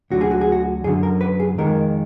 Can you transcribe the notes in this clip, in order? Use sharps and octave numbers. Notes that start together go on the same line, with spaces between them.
D2 D3 F#3 F#4
G#4
F#4
G#4
F#4
F#2 D3 F#3 G#4
A#4
B4
G#4
F2 D#3 G#3 A#4